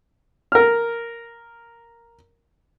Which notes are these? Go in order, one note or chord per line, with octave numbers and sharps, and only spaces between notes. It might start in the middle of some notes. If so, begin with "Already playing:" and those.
A#4 F6